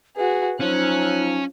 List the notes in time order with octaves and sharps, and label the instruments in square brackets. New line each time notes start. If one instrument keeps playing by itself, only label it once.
[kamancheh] F#4 G#4 [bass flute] B4
[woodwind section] F3 F#3 [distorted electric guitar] C#4 [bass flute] D#4 [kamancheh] F#6